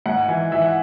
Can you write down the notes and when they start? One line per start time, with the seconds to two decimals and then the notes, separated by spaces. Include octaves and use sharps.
0.06 G#2 F#5
0.28 E3
0.52 E3 E5
0.62 F#5